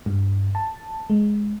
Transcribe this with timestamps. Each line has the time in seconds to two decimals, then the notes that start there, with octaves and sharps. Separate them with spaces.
0.06 G2
0.55 A5
1.10 G#3